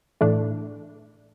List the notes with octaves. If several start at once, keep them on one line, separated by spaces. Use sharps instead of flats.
A2 E3 A3 D4